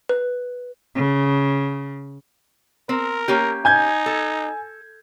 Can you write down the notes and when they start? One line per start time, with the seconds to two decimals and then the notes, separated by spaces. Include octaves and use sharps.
0.09 B4
0.97 C#3
2.89 C4 A#4
3.28 A#3 C#4 G4
3.65 D#4 G#5 G6 G#6
4.06 A4